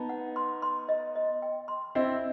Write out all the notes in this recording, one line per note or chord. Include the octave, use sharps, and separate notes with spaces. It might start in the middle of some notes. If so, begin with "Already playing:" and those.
Already playing: B3 D#4 A5
F#5
C6
C6
D#5
D#5
G5
C6
C4 E4 D#5